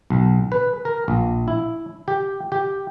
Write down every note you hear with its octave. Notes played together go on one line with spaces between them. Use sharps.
B1
B4
A#4
A#1
E4
G4
G4